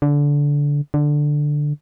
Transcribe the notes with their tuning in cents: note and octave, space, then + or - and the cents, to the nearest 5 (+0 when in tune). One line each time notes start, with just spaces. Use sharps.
D3 -20
D3 +5